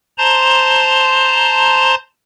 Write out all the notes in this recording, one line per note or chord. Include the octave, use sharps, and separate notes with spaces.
C5 A5 A#5 C6